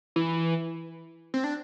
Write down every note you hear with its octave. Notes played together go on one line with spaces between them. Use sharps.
E3
C4
D4